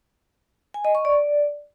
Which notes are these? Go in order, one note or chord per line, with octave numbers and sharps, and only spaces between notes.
G#5
D#5
C#6
D5